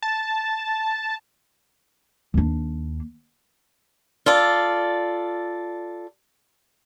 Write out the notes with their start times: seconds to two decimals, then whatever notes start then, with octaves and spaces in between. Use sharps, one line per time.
0.02 A5
2.34 D#2 D4
4.26 F4 A4 D5